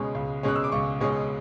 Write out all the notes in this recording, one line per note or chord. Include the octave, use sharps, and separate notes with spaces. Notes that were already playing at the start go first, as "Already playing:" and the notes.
Already playing: C#2 B2 G#3 C#4
C#2
B2 G#3 C#4 F#6
E6
D6
C#2 C#6
B2 G#3 C#4